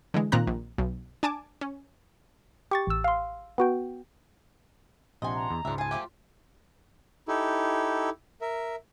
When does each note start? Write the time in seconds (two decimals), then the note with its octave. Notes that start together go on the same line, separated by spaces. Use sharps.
0.14 D3 E3 G#3
0.32 A#2 D#3 C4 A#5 F#6
0.47 A#1
0.78 B1
1.23 D4 G#5 A5 D6
1.61 C#4
2.71 G4 C#6 A6
2.87 A1 E6
3.04 F5 C6
3.58 B3 F#4 G5
5.22 A#1 C3 D4 D#5 F#5 G#5 C6
5.35 A#5
5.50 E2
5.65 C#2 G#2 D4 F4 E5
5.78 G#4 G#5 A5
5.91 F3 A3 G4
7.28 D#4 E4 G4 A4
8.41 A#4 E5